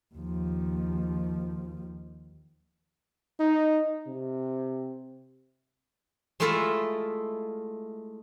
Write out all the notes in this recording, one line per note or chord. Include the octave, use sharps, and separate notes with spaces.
D#2 F3
D#4
C3
G#3 A3 E4 F4 A4 E5